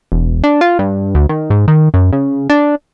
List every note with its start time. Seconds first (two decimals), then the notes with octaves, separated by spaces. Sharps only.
0.12 E1
0.44 D4
0.61 F4
0.79 G2
1.15 D2
1.29 D#3
1.50 G#2
1.68 D#3
1.94 F#2
2.13 C#3
2.50 D4